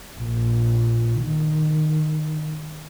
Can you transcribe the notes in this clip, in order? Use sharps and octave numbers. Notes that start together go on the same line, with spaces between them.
A#1 A#2
D#3